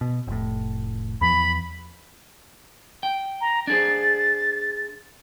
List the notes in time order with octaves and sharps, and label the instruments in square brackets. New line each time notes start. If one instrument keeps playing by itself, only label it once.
[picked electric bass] B2
F1 A2
[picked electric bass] E2 F3 [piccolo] B5
[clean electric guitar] G5
[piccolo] A#5
[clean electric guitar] D4 G#4 C5 [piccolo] A6